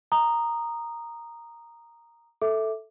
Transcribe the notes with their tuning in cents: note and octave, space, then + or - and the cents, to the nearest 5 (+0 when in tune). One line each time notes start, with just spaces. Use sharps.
A#5 +0 D#6 -15
A4 +0 E5 -10 D6 +0